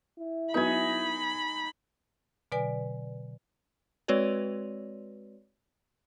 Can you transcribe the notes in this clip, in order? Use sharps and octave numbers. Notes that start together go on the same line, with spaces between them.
E4
F#3 B3 D#4 E5 G#5 B5
B2 D3 F#3 B4 D5 G#5
G#3 C4 F#4 B4 C#5 D5